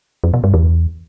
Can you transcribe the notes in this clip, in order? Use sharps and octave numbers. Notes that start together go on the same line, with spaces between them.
F2
B2
G2
E2